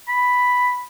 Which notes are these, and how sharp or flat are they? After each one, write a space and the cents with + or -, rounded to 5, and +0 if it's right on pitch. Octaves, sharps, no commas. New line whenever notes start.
B5 +0